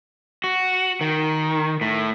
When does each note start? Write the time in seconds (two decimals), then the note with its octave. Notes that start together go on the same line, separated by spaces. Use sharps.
0.44 F#4
1.01 D#3
1.81 A2